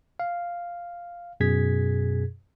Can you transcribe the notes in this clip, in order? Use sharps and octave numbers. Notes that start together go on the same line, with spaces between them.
F5
F#2 B2 G#4 G#6 B6